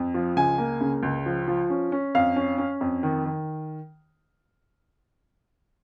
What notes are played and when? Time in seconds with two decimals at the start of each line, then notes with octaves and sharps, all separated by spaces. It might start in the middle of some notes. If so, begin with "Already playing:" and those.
Already playing: F2
0.14 F3
0.36 C#2 G#5
0.58 A#3
0.81 C#3
1.03 C#2
1.26 F3
1.48 F3
1.70 C#4
1.92 C#4
2.15 F2 F5
2.36 C#4
2.58 C#4
2.81 F2
3.03 D#3
3.26 D#3